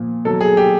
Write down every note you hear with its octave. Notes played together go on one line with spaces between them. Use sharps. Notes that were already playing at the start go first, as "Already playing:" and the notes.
Already playing: A#2 F3
B2 F#3 A4
G#4
G4